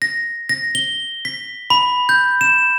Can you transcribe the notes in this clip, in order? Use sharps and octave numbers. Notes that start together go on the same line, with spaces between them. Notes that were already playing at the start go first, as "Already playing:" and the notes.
A#6
A#6
G7
B6
B5
G6
E7